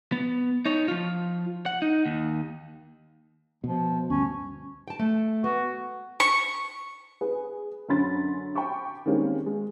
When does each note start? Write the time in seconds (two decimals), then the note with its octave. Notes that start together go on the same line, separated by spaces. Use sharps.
0.12 B3
0.65 D#4 C#5
0.88 F3 F4
1.66 F#5
1.82 D#4
2.05 D#2
3.64 B2 F3
4.10 D2 G2 C#4
4.88 G5 A5
4.99 A3
5.44 B3 F#4
6.20 C#6
7.21 G#4 B4
7.89 F#2 D3 C#4 B5 C6 A6
8.55 G5 B5 C#6 D6
9.06 D#3 G3 G#3 A#3 C4 C#4
9.46 G#3